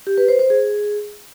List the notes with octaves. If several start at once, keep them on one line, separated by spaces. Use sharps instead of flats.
G4
B4
C5
C5
G#4